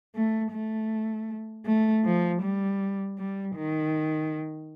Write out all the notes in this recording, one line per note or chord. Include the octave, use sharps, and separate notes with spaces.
A3
A3
A3
F3
G3
G3
D#3